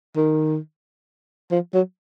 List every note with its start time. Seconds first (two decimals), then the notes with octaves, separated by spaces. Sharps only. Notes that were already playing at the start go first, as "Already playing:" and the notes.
0.16 D#3
1.52 F3
1.74 F#3